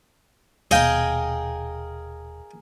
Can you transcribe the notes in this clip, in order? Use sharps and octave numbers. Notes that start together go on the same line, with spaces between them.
D#1 B2 G#4 A#4 D#5 F5 G5